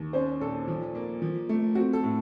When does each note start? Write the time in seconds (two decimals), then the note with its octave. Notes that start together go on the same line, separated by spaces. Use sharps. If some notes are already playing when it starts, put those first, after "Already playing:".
Already playing: D#2
0.13 C#4 C5
0.40 A#2 A4
0.67 F3
0.95 A#3
1.22 F3
1.49 A3
1.75 C4 F#4
1.93 A4
2.03 A2